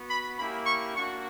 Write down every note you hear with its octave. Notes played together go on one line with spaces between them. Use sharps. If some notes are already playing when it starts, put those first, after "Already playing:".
Already playing: B3 F#4
B5
A#3 C#4 E4 G4 B5
C#6
A#3 D4 F#4 C#6